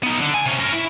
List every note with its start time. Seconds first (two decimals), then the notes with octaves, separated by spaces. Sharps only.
0.03 B3 D#4
0.21 D3
0.34 G#5
0.46 C3 C#4
0.59 C#4 A#4
0.72 E4